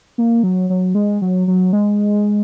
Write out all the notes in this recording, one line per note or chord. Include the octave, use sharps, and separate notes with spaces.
A#3
F#3
F#3
G#3
F#3
F#3
G#3